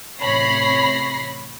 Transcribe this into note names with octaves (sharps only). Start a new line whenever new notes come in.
A1 C3 C#5 B5 A#6 C7